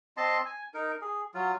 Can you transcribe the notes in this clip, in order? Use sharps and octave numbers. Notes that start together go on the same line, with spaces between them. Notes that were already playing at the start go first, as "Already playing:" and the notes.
C4 D#5 A5 C6
G#5
D#4 A#4
G#4
F#3 F4